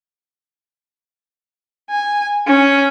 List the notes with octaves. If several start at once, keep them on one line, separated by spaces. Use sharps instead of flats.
G#5
C#4